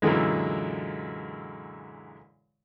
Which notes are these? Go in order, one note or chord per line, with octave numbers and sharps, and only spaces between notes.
F#2 A#2 D3 E3 G#3